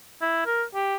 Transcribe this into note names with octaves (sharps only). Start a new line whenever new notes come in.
E4
A#4
G4